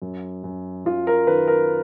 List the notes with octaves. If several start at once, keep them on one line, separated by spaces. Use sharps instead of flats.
F#2
F#2
F#2 F4
A#4
D#3 B4
A#4